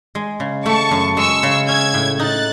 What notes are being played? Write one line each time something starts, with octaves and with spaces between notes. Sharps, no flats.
G#3
C#3
A3 A5 C#6
F#2
G#3 C#6 E6
C#3
C#4 E6 G#6
A2
D#4 F#6 A6